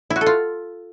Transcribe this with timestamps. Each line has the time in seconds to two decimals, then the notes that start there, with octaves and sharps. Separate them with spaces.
0.10 E4
0.16 F#4
0.21 A4
0.26 F4